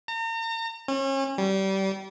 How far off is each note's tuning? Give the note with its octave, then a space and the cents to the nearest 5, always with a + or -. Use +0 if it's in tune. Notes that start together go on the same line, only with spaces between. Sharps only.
A#5 -40
C#4 -35
G3 -25